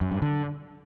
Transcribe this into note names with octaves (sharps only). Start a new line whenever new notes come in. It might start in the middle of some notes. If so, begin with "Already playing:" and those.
F#2
G2
D3